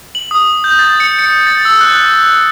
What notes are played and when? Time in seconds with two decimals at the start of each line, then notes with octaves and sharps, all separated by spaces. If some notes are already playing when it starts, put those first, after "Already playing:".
0.15 F#7
0.31 D#6
0.64 G6
0.79 A6
1.00 C#7
1.19 C#7
1.47 A6
1.65 E6
1.81 F#6